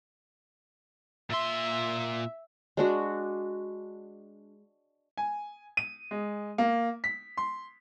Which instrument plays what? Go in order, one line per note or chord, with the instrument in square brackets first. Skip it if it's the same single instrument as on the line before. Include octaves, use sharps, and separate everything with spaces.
[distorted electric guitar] A#2 C6 [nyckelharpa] E5
[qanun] G#3 D4 F#4
[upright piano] G#5
D#7
G#3
A#3
B6
C6